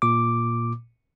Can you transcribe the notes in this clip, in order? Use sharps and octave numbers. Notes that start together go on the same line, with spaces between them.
A#2 D6